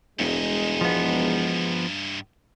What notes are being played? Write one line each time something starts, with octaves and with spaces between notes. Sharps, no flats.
E1 G2 G#3 D#4
F3 B3